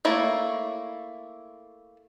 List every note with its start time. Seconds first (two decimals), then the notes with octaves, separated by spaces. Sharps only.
0.05 A3 A#3 E4 C#5